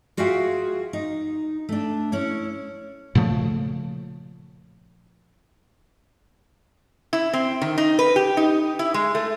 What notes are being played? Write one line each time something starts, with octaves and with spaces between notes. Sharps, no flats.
F4 F#4 G#4 E5 F5 G5
D#4
A3 D4
C#4 E4 C#5
A#2 C#3 F3 A3
E4
C4
D#3
D#4
B4
G4
D#4
E4
G#3
A3